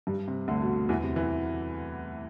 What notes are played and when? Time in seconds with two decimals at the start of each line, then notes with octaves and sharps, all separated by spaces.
0.07 G2 G3
0.28 C3
0.48 D2 D3
0.62 B2
0.89 E2 E3
1.03 C3
1.16 E3